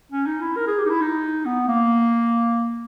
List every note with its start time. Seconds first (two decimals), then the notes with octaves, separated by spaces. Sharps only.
0.12 C#4
0.27 D#4
0.41 E4
0.57 A#4
0.68 G#4
0.79 G4
0.86 D#4
0.90 E4
1.01 D#4
1.46 B3
1.68 A#3